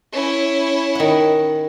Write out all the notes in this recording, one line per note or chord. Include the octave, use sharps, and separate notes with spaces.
C#4 E4
D#3 F#5